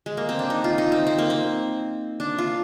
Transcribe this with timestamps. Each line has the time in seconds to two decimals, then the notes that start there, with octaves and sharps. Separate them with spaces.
0.06 G#3
0.17 A#3
0.29 C4
0.39 D4
0.50 D#4
0.64 F4
0.78 D#4
0.92 C4
1.07 C4
1.19 A#3
1.30 C4
2.20 D4
2.39 F4